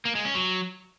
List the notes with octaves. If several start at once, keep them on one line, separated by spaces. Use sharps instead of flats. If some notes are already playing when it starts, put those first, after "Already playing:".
A#3
G#3
C#4
F#3